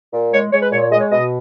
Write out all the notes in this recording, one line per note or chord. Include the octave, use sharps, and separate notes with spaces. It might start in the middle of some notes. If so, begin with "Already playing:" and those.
A#2
G#3 C#5
G#3 C#5
B4
A#2 C#5
C#5
G#3 D#5
C#5
B2 D#5